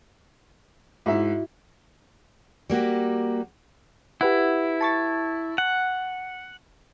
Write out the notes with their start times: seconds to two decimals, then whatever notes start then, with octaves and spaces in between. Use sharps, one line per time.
1.06 G#2 E4 F#4 E5
2.70 G3 A#3 F#4 G4
4.21 E4 G4 B4 F#5
4.81 A5 C#6 A6
5.58 F#5